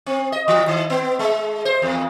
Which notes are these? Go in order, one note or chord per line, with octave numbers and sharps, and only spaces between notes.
C4
D#5
E3
D#3
B3
G#3
C5
E2